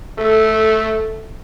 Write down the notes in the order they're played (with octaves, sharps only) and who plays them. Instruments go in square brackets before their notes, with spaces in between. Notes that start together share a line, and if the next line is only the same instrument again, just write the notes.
[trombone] A3 [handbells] A4